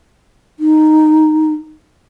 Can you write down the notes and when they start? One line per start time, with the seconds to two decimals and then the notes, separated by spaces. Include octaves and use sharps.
0.60 D#4